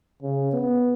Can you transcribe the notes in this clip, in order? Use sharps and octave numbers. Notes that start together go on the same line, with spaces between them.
C#3
B3